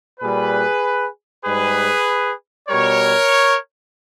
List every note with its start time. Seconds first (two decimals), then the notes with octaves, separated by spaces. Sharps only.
0.20 A#2 G3 G#4 B4
1.45 G#2 G3 G#4 B4
2.69 B2 G3 A#4 C#5